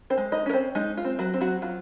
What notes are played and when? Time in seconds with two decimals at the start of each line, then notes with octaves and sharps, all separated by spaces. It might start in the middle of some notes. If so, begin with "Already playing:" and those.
0.10 C4 C5
0.18 G#3
0.32 D#4 D#5
0.46 C#4 A#4
0.53 C4 C5
0.75 G#3 D#4
0.97 F4
1.04 C4
1.19 F#3 F#4
1.34 C4
1.41 F#3 F#4
1.62 F#3 F4